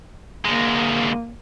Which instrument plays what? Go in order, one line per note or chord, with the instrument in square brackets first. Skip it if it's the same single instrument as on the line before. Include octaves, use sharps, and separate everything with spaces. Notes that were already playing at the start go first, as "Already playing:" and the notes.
[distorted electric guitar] D2 G#3 [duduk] A#3